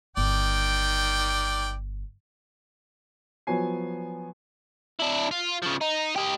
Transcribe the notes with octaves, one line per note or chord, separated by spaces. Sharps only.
G1 D#3 D5 G5
F3 F#3 B3 C#5 G#5 C7
D4 E4
F4
C#3 F3
D#4
G4 D#5